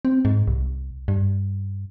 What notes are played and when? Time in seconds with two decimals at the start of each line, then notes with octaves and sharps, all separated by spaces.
0.05 C4
0.25 G#2
0.48 C2
1.08 G2